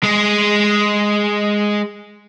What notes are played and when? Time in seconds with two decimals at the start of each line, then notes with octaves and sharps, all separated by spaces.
0.03 G#3 G#4